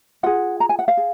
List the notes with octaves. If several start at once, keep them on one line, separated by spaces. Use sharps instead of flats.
F4 G#4 F#5
A#5
G#5
F#5
F5
G#4